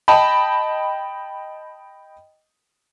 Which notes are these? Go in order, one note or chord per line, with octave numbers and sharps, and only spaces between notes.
D#5 G5 A5 B5